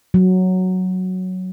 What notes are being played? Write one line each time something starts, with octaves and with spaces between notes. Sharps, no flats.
F#3